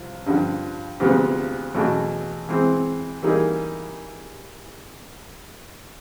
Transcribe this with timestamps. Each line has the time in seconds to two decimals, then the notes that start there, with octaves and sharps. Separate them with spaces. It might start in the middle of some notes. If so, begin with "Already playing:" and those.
Already playing: C2 F3
0.26 G2 D3 F3
1.00 D2 C3 F3 G#3 B3
1.75 E2 B2 F#3 A3
2.49 E3 G#3 C4
3.22 E3 G3 A#3 D#4 G#4